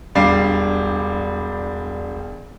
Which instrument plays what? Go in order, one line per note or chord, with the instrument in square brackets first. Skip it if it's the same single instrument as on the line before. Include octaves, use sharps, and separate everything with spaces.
[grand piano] E1 G3 D4 F5 C7